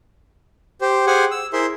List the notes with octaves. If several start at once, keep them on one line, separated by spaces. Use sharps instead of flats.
G4 C5
G4 G#4 C5 F#5 G#5
E6
E4 G#4 A#4 C5 E5 C6